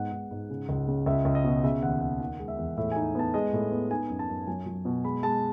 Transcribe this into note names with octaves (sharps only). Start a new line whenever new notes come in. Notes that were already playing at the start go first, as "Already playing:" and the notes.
Already playing: G#2 B3 F#5
G#2
G#2
C#3
C#2
C#3
C#2 E5
C#2
D#5
B2
C#3 E5
D#2 F#5
D#2 F#5
D#3 F#5
G#3
E5
E2
A2 E5
D#4 G#5
B3 A5
G#3 D#5
A2
B3
D#4 G#5
F#2
A5
F#2
F#3 G#5
F#3
B2
G#3 B5
G#3 A5